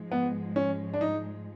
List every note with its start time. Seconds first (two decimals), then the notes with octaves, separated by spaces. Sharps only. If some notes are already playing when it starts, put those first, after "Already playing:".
Already playing: G#2 F3 G#3
0.11 B3
0.56 C#4
0.94 D4
1.01 D#4